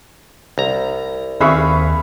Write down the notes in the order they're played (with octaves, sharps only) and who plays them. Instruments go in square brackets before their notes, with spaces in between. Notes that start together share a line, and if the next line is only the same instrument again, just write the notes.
[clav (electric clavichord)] C2 A#5
[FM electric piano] D#2 [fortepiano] C4 G#4 E5 [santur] B4 F5 C#6